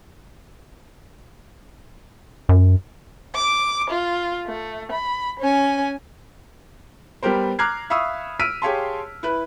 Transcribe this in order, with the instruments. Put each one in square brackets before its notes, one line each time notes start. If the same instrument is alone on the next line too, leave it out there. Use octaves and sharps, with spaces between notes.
[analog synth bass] F#2
[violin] D6
F4
A3
B5
C#4 G#5
[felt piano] G3 B3 G4 A#4 C5
A#5 D6 F6 F#6 G#6 C7
E5 F5 B5 C#6 D#6 E6
E6 F6 B6 D7 D#7
G4 G#4 C#5 F5 A5 C6
E4 B4 F#6